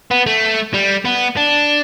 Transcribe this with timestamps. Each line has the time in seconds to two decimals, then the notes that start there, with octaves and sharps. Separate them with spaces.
0.11 B3
0.27 A3
0.74 G3
1.05 B3
1.37 D4